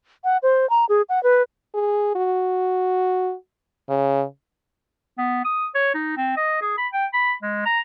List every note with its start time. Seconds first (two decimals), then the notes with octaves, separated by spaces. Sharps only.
0.24 F#5
0.43 C5
0.70 A#5
0.89 G#4
1.09 F#5
1.23 B4
1.74 G#4
2.15 F#4
3.89 C#3
5.18 B3
5.45 D#6
5.75 C#5
5.94 D#4
6.17 C4
6.37 D#5
6.62 G#4
6.78 B5
6.93 G5
7.14 B5
7.43 G#3
7.66 A#5